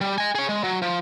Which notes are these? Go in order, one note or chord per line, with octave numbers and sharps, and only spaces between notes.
G3
D#5 G#5
G#4 C#5
G#3
F#3
F3